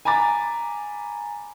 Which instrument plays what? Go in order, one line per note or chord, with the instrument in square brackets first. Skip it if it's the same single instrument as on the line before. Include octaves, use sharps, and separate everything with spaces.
[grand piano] G#5 A#5 B5 D6 A6